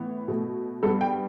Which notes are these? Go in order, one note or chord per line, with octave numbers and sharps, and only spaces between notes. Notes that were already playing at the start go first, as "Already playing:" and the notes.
Already playing: A2 E3 B3
B2 A3
G2 G3 B3 A4
G5